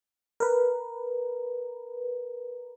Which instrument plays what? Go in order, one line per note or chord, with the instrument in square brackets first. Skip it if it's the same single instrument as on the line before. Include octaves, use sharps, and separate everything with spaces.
[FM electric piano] A#4 B4